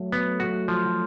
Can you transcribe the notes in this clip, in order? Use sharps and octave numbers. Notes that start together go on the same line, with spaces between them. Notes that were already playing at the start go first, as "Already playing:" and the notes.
Already playing: F#3 A3
B3
F#4
F3